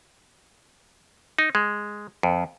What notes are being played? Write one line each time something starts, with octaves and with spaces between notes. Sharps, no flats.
D#4
G#3
F2